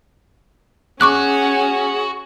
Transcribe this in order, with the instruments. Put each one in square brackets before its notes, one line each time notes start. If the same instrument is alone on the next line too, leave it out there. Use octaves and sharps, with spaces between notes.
[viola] C#4 [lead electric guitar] F#4 [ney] G#4 [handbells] C#6 D6 F#6